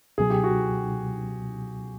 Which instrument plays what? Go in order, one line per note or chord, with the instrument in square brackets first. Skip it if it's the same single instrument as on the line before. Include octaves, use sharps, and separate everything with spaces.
[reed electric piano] C#2 B2 F#3 [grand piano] G#4
[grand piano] G4
F#4